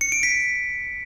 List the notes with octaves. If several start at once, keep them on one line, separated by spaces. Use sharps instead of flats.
C#7
D7
B6